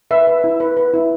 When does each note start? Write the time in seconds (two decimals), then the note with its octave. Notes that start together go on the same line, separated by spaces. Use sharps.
0.11 B4 E5
0.27 B4
0.44 E4
0.60 B4
0.77 B4
0.94 E4